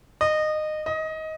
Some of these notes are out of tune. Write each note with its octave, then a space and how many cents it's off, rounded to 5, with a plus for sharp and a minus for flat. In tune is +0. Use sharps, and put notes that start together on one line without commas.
D#5 -20
D#5 +20